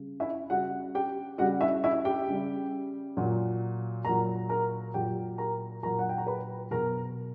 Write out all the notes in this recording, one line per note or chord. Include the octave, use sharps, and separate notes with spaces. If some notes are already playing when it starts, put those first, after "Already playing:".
Already playing: C#3 G3
E4 E5
C#3 G3 F#4 F#5
G4 G5
C#3 G3 F#4 F#5
E4 E5
E4 E5
G4 G5
C#3 G3
A#2 F#3
A#2 F#3 A#4 A#5
A#4 A#5
A#2 F#3 G4 G5
A#4 A#5
A#2 F#3 A#4 A#5
F#5
G5
A#5
B4 B5
B2 F#3 A#4 A#5